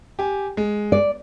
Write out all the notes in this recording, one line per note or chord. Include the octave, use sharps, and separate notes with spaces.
G4 G#5
G#3
D5